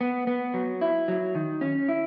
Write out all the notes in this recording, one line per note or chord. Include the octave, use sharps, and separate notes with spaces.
B3
B3
F#3
E4
F#3
D#3
C#4
E4